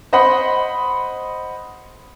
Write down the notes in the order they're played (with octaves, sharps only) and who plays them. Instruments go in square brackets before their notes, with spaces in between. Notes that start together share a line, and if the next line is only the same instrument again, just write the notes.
[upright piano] C5 D#5 F#5 B5 C6